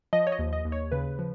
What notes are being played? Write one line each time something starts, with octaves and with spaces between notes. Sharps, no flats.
F3 D#5
C#5
D#5
D#2
D#5
D#2
C#5
C#3 B4
F3